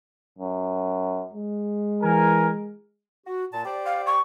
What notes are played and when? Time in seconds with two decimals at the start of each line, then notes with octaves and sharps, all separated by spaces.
0.39 F#2
1.33 G#3
2.03 E3 A#4 G#5
3.26 F#4
3.52 A#2 A5
3.65 G4 C5 D5
3.86 F5
4.06 C#6